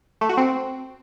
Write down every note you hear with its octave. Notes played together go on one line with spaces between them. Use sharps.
A3
F#4
C4